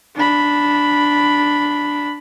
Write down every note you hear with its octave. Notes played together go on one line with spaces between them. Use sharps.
D4 B5